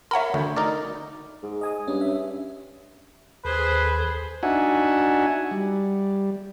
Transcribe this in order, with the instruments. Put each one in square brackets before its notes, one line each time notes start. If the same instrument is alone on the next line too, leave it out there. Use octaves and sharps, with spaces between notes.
[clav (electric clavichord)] A#4 C#5 [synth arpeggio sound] E5 F#5 B5
[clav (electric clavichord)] D2 [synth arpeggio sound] D3
[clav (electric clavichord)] D#4 A#4 D5
[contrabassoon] G#2
[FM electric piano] D#5 G#5 D#6
[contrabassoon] G2 [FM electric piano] C#4
[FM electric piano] E5
[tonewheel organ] D#2 A4 [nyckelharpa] G#4 C5 [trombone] B4
[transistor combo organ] D4 D#4 F#4 E5 F#5 G#5
G3